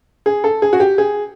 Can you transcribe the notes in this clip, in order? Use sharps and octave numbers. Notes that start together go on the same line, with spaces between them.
G#4
A4
G#4
F#4
G4
G#4